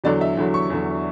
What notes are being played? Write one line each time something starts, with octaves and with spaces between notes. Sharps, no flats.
E2 D3 F#3 D5
E5
E2 D3 F#3
C#6
E2 D3 F#3